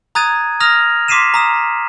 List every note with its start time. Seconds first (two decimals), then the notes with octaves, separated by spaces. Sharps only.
0.15 A#5 D#6 F#6 G#6 A6 D#7
0.60 D#6 F6 A#6 F7
1.08 C6 D6 B6 C7 D#7 E7
1.34 A#5 D#6 E7